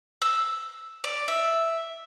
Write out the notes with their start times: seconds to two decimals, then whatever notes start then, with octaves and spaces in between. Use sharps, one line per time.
0.22 E6
1.04 D5
1.28 E5